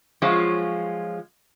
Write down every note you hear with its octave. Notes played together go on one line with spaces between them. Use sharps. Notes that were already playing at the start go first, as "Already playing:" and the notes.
F3 F#3 G#3 C#4 F4